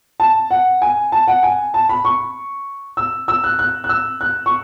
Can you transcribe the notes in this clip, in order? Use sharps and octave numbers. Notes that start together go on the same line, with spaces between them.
A5
F#5
G#5
A5
F#5
G#5
A5
B5
C#6
E6
E6
F#6
F#6
F#6
E6
F#6
C#6